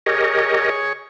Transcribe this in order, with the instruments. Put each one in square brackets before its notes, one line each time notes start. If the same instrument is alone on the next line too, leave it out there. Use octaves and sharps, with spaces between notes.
[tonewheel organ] G4 A#4 D#5 [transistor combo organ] G#4 C#5